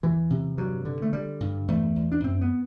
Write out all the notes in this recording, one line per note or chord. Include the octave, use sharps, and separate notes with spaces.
E2 E3
C3
G2 F#3
D3
A3
D3 G3
G2
E2 A3
E2
D4
F#2 C4
B3